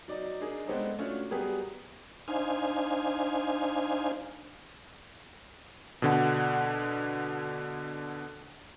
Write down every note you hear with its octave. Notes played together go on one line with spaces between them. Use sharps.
F#3 D#4 D5
D4 D#4 G#4 A#4
G#3 B3 C4 D4 D#4 A4
A3 C#4 D4 F4 F#4
F#3 G3 B3 G4 G#4 A#4
D4 D#4 C5 F5 G#5
B2 D3 F#5